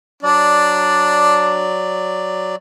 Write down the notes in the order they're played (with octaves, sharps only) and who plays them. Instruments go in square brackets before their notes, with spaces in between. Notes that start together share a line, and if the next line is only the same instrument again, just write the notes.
[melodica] F#3 D5 [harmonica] D4